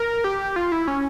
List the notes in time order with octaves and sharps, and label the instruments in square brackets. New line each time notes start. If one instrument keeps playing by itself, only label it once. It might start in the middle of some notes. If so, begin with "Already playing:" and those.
Already playing: [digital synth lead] A#4
G4
F4
E4
C#4